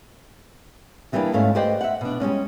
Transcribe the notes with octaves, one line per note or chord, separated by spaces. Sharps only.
D#3 E3 G3 A3 A#3 D4
D2 G#2 A3 C#4 F5
G4 B4 C5 D5 D#5 G5
E5 F#5
B2 D4
G3 G#3 C#4 D4